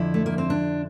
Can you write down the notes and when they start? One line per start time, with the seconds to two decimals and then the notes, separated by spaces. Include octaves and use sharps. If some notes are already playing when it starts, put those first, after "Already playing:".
Already playing: F2 D3 F3 E4
0.14 A3
0.26 A#3
0.38 C4
0.50 D4